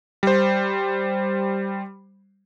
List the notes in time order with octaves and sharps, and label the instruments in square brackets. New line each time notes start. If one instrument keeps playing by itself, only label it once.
[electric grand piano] G3 C5